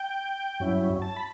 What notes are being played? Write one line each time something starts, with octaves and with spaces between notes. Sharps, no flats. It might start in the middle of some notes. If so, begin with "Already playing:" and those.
Already playing: G5
G2 F#3 C#4 E4
A5
B5